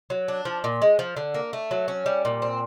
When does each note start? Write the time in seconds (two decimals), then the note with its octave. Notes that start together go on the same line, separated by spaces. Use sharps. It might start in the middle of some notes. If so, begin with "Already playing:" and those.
0.10 F#3
0.28 D4
0.45 F3
0.64 A#2
0.82 G#3
0.99 F3
1.17 D3
1.34 A#3
1.53 A3
1.71 F#3
1.88 C#4
2.06 G3
2.25 A#2
2.42 C4